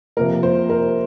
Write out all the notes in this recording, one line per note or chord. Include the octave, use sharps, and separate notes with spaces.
C3 F3 A#3 A#4
C5
A#4